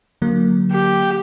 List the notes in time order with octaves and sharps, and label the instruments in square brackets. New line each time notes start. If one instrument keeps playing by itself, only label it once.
[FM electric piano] D3 F#3 A#3
[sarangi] G4